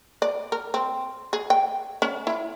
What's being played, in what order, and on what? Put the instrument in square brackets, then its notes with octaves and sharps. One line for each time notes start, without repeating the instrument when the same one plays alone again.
[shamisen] D5
A#4
C4
G#4
G5
C#4
E4